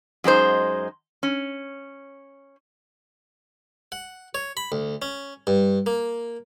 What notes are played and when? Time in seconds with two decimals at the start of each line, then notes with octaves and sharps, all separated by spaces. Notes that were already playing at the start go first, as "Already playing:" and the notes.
0.24 F#2 G#3 D#4 C5
1.23 C#4
3.92 F#5
4.35 C#5
4.57 B5
4.72 D2
5.02 C#4
5.47 G2
5.86 A#3